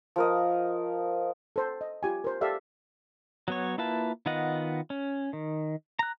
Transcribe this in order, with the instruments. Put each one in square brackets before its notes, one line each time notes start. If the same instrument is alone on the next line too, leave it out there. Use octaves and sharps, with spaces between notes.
[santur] F3 A#4 D#5
[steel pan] A4 C5
D#5
F4 G4 G#5
A#4 C5
G4 A4 D5 E5 F5
[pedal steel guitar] F#3 B3 C#5
A#3 E4 F4 B4 A5
D#3 B3 F4 D#5 F#5
C#4
D#3
A#5 F#6